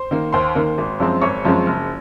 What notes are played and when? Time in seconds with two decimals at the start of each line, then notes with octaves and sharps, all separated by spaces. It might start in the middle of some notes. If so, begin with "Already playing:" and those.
Already playing: C5 C6
0.11 D#3 A#3
0.33 D#2 C5 C6
0.55 D#3 A#3
0.78 G#1
1.00 F#2 F3 G#3 C4
1.22 G#1 C#5 C#6
1.45 F#2 F3 G#3 C4
1.66 F#1